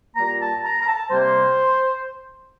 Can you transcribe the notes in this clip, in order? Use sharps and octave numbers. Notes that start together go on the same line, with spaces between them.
A#2 G3 A#3 A#5
A5
A#5
A#5
A5
C3 G3 A#3 C5